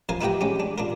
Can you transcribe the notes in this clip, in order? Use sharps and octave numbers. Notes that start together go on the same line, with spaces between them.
F2 A#4 F5 G#5
D#4 E4 G4 B4 G5 A#5
G#3 C#4 G4
D4
D4 F4 A#4